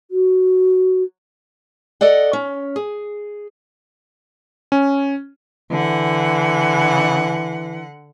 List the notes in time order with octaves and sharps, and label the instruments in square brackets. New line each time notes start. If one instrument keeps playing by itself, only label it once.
[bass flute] F#4
[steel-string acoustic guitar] A4 D5 D#5 F#5
C#4
G#4
[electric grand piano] C#4
[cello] D3 F#5 [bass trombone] E3